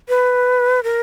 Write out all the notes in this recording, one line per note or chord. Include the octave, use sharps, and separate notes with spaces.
B4
A#4